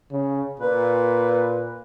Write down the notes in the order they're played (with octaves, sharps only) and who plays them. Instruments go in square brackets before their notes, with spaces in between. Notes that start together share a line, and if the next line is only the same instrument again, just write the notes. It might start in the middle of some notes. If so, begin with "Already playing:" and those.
[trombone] C#3
[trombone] A#2 [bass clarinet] B4